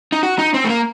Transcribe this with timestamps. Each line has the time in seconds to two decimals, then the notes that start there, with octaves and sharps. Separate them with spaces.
0.12 D#4
0.23 F#4
0.38 D#4
0.54 C4
0.64 A3
0.69 A#3